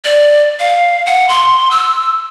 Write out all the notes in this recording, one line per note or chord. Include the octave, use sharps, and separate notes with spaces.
D5
F5
F#5
C6
E6